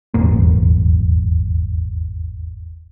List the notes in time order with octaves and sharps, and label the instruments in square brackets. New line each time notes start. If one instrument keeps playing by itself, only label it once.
[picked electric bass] D#1 G#1 E2 A#3